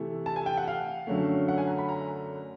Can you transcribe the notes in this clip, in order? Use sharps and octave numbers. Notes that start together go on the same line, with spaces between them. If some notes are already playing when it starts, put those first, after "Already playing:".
Already playing: C3 E3 A3
A5
G#5
G5
F#5
F5
F#2 D3 F#3 A3
F#5
G#5
A#5
B5
A#5